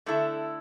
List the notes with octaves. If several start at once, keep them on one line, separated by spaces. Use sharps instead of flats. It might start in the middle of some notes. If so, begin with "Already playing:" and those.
D3 A3 E4 A4